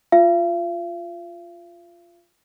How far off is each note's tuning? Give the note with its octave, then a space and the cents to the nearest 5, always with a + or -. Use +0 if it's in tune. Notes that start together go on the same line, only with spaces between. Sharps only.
F4 -5 F5 -45